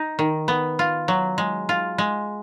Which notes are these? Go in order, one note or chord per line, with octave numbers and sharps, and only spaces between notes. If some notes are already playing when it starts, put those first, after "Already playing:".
Already playing: D#4
D#3
B3
F4
F#3
G#3
F4
G#3